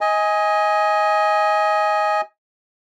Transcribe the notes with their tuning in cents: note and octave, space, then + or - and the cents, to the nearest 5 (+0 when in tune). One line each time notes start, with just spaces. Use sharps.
D#5 +20 G#5 -5